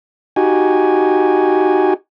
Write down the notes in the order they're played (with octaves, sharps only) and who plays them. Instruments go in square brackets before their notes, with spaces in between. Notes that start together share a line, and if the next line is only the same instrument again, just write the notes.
[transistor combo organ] D#4 F#4 G4 G#5